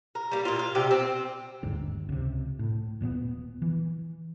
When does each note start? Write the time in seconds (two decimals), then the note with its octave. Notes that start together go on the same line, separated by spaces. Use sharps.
0.15 A#4
0.31 G3 A#3
0.45 A#2 F4
0.59 F5
0.75 C3 G3 G4
0.91 C4
1.63 G1 D#2 G#2 D3
2.09 C#2 C3
2.59 A2
3.01 D#1 A#2 F#3 B3
3.62 E3